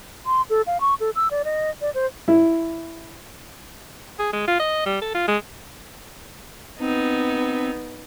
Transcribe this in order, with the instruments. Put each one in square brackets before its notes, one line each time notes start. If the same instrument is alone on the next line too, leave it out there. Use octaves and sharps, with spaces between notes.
[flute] C6
A4
F5
C#6
A4
E6
D5
D#5
D5
C5
[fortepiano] E4
[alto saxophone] G#4
G#3
F4
D#5
G3
A4
F4
G#3
[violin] B3 D#4 [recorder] C4